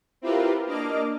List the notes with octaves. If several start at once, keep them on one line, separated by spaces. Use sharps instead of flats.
C4 E4 F4 G4 A#4 B4
A#3 D4 D#5 D6 F6